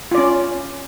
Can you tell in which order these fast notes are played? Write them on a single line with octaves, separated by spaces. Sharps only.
F4 D5 C#4